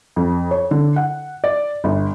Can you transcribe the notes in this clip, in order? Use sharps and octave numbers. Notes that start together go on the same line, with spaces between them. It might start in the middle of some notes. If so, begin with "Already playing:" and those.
F2
C#5
D3
F#5
D5
G1